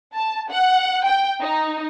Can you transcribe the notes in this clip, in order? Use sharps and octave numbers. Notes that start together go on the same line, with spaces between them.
A5
F#5
G5
D#4